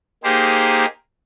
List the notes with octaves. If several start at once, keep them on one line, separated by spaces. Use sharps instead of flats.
A#3 D#4 G4 G#4 C5